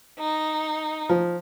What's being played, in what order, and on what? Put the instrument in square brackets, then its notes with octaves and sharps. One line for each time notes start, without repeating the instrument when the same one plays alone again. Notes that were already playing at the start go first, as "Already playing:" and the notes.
[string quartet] D#4
[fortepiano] F3